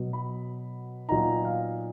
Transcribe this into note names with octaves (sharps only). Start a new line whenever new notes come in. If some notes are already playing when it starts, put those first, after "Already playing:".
Already playing: B2 F#3 B3
B5
A#2 F#3 B3 D#4 A#5
F5